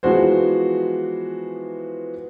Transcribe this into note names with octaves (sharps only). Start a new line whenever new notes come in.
E3 F3 G#3 B3 F#4 C5